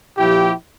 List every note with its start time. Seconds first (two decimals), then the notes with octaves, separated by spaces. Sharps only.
0.18 A#2 F3 E4 G4